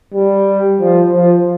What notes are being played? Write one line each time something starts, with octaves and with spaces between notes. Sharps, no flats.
G3
F3
F3